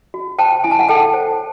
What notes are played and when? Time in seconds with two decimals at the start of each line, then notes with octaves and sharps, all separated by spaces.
0.14 F#4
0.39 C5 G5 A5
0.64 E4 G#5
0.71 A5
0.79 F#5 G#5
0.89 A4 G5 A5
1.14 C5